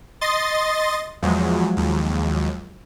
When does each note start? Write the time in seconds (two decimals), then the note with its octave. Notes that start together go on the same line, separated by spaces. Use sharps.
0.21 D#5 C6 A6
1.23 E2 F3 F#3 G#3
1.77 D#2